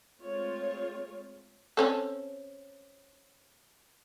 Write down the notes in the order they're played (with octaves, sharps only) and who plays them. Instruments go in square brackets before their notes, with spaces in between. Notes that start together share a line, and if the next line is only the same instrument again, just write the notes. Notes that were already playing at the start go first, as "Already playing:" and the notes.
[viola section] G#3 A3 C4 F4 C#5
[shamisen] C4 C#4 A4